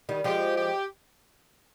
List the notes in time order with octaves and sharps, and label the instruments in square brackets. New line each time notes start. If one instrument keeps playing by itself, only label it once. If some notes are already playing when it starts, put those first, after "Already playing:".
[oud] D#3 G3
[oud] F3 G#3 [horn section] G4
[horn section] G4